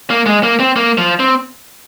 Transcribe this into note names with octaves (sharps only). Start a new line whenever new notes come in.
A#3
G#3
A#3
C4
A#3
F3
C4